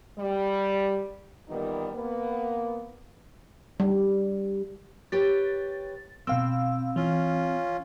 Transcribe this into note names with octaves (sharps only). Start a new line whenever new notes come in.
G3
A#2 D#3 E3 G3 B3 D#4
A#3 B3 B4
G3
G4 B4 C#5 A6
B2 C4 F5 E6
E3 C#4 F4